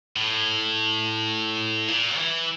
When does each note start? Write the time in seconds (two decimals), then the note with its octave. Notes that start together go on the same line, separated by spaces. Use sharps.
0.16 A2
1.88 A#2
2.16 E3